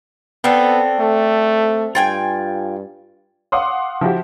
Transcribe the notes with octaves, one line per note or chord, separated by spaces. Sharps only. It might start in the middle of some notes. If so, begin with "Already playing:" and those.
B3 C4 D4 A4
A3
G2 F4 G5 G#5
F5 F#5 C6 D6 D#6
F3 E4 F#4 G4